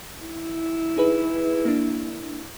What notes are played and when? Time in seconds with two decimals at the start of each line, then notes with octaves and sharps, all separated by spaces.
0.21 E4
0.97 D#4 G#4 B4
1.65 A#3 D4